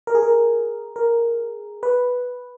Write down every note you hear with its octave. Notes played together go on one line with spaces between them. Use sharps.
A#4
G#4
A#4
A#4
B4